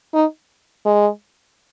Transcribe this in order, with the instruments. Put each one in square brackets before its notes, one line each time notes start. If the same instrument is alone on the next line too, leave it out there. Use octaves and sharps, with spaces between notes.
[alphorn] D#4
G#3